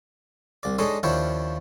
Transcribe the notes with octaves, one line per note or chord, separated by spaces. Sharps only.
C2 D5
G#3 D4 D#4 A4 C#5
D#2 F3 D4 E4 C#5 G5